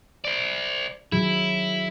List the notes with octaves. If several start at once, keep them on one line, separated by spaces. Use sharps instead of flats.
C5 D5
D#3 F#3 E4 G#4